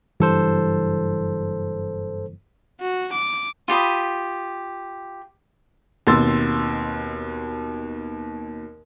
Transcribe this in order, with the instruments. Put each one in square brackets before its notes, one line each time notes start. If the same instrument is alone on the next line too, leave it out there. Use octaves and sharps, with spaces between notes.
[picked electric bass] F#1 E3 G3 [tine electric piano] G2 A4 C5
[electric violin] F#4
D6
[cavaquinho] F4 G4 B5 D#6
[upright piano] D#2 B2 C4 C6 E6 A6